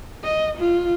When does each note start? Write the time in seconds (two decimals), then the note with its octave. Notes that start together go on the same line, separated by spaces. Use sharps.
0.23 D#5
0.58 F4